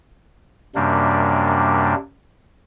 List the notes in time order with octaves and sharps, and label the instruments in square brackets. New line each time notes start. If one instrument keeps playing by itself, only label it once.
[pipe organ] F#2 C3 G3 A#3 D4